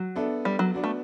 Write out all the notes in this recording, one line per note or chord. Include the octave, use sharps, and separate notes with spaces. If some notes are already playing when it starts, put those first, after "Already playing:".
Already playing: F#3
B3 D4 A4 E5
G3
F#3
B3 D4 F#4
A3